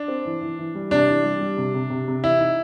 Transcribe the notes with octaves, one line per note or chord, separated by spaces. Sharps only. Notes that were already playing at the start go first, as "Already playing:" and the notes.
Already playing: D4
C4
E3
E3
E3
G3
C3 D4
E3
G3
G3
C3
C3
C3
C3
E3 E4
D#4